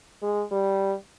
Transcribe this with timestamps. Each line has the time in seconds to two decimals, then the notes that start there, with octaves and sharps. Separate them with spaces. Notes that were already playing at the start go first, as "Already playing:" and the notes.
0.22 G#3
0.52 G3